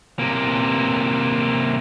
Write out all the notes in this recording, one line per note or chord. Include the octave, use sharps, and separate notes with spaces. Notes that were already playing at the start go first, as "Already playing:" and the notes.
C3 A#3